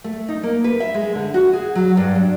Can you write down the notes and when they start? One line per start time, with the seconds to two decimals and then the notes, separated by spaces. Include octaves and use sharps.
0.04 A3
0.29 D#4
0.43 A#3
0.64 B4
0.80 E5
0.94 G#3
1.15 D3
1.34 F#4
1.53 G#4
1.75 F#3
1.97 G2
2.15 D4